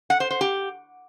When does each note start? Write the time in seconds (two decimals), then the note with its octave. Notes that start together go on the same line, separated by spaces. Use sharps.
0.10 F#5
0.20 C5
0.31 C5
0.41 G4